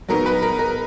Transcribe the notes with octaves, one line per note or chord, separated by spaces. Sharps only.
F#3 B3 D#4 A#4
B4
A#4
A#4